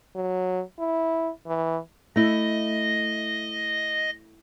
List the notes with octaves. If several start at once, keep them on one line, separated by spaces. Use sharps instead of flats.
F#3
E4
E3
A3 E4 D#5 A#6